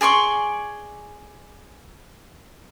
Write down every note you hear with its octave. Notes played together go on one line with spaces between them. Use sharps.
G#4 D5 C6 C#6